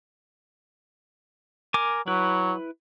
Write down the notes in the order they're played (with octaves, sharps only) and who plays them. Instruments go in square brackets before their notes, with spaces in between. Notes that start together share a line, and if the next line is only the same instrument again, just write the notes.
[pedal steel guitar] A#4 G#5 D6
[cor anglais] F#3 [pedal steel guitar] E4 B4